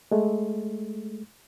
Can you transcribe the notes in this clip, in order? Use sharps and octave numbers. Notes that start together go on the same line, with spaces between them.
G#3 A3